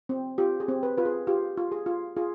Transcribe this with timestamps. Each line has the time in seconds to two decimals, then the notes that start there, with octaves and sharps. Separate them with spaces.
0.09 C4
0.38 F4 G4
0.60 G#4
0.68 C4
0.83 B4
0.97 F4 B4
1.05 G#4
1.27 F4 G4
1.57 F4
1.72 G#4
1.86 F4
2.16 F4 G#4